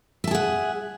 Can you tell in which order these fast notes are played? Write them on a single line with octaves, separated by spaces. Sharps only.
E5 A5 G#4 F#5